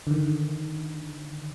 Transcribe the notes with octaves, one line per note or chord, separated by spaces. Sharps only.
D3 D#3